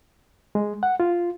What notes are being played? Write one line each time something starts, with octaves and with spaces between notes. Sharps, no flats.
G#3
F#5
F4